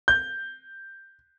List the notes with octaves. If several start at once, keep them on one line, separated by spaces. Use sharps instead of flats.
G6